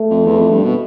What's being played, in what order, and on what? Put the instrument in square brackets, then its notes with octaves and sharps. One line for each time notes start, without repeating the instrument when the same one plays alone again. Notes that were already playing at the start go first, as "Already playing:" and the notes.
Already playing: [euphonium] A3
[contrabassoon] F2
E2
F2
G2
B2